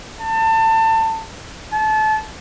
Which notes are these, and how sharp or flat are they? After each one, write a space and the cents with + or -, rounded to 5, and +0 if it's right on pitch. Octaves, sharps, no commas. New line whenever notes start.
A5 +25
A5 -25